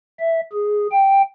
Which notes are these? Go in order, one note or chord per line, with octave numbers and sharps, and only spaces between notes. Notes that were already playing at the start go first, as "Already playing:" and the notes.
E5
G#4
G5